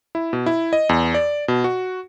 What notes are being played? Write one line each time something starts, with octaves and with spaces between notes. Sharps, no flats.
E4
B2
E4
D#5
E2
D5
B2
F#4